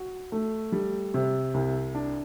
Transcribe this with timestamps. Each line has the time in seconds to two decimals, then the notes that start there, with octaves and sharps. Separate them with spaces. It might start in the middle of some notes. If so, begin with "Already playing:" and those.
Already playing: F#4
0.32 A3
0.72 G3
1.14 C3
1.54 C2
1.95 D4